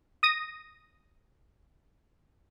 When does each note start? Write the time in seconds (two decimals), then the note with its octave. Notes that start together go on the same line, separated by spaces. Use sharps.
0.23 D#6 A#6 D#7